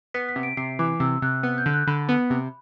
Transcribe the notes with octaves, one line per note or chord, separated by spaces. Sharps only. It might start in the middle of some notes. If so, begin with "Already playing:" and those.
B3 B6
B6
C3
D7
C3 C7
E3 D6
C3 E6
C3 F#6
B3
G6
D3
F#6
D3 B5
B3
C3